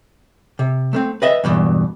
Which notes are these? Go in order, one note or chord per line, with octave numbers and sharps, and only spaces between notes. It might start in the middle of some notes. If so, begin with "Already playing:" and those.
C3
A3 A#3 C4
B4 D#5 E5
E2 G2 B2 E3